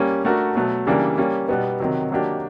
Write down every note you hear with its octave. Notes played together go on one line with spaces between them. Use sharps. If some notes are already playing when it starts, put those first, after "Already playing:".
Already playing: G3 A#3 C#4
A3 D4 F#4 A#4
B2 F#3 A3
C#3 E3 G3 A#3 D4
G3 A#3 C#4
B2 G3 B3 D#4
C3 D#3 F#3
D#3 F#3 A#3 D4 G4